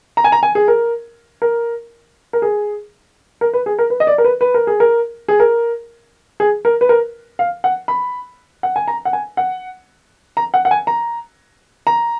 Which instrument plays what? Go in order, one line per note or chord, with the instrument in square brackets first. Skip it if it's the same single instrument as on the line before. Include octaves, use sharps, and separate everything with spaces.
[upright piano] A#5
G#5
A#5
G#5
G#4
A#4
A#4
A#4
G#4
A#4
B4
G#4
A#4
B4
D#5
D5
A#4
B4
B4
A#4
G#4
A#4
G#4
A#4
G#4
A#4
B4
A#4
F5
F#5
B5
F#5
G#5
A#5
F#5
G#5
F#5
A#5
F#5
F#5
G#5
A#5
A#5